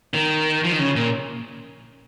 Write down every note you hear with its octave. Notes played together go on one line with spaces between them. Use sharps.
D#3
F3
D#3
C#3
A#2